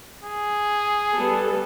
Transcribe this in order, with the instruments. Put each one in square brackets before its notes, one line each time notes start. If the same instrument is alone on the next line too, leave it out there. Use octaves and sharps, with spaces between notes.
[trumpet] G#4
[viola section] G3 B3 A4